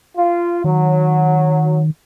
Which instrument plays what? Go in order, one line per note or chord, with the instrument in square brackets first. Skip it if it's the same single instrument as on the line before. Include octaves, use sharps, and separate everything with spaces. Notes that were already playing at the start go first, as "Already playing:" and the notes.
[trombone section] F4
[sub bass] D#3 [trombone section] F#3